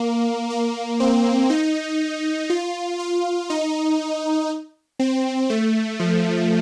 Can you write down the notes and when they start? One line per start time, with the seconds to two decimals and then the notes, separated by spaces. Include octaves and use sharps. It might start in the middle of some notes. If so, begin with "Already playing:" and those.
Already playing: A#3
0.50 A#3
1.00 C4
1.50 D#4
2.50 F4
2.99 F4
3.50 D#4
4.99 C4
5.50 A3
6.00 F3